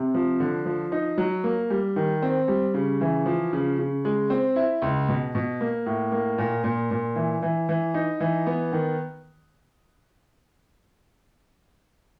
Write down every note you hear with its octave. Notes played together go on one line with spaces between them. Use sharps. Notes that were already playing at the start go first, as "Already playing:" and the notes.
Already playing: C3
F3
D3
F3
D#4
F#3
A#3
G3
D#3
C4
G3
C#3
E3
F3
C#3
C#3
G#3
C4
E4
C#2
B2
B2
A#3
A2
A#3
A#2
A#2
A#2
E3
E3
E3
D#4
E3
B3
D#3